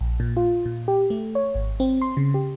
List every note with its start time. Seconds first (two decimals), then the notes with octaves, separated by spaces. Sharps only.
0.01 A#1
0.20 A#2
0.37 F4
0.66 A#2
0.88 G4
1.10 A3
1.35 C#5
1.55 G#1
1.80 C4
2.02 C6
2.17 C#3
2.34 G4